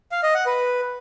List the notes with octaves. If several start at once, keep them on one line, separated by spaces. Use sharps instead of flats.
F5
D#5
F#5
B4